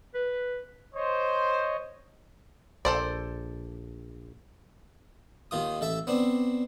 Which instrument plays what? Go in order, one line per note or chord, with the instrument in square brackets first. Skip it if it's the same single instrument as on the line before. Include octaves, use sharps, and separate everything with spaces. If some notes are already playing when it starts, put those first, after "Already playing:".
[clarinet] B4
[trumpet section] C5 [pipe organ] C#5 D#5
[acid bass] A#1 [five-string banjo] A4 C5 D5
[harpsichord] D#2 D#3 F4 D#6
A1 A4 E5
B3 C4 D4